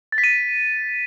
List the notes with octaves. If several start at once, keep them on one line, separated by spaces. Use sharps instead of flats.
A6
B6
D#7